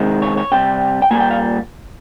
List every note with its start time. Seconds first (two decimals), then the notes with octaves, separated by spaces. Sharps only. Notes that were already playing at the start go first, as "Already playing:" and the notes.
Already playing: C3 D#3 G#3 C4
0.22 C#5
0.37 C#5
0.52 C3 G3 C4 G5
1.02 G5
1.11 A#2 G3 A#3 G#5
1.20 G5
1.31 F5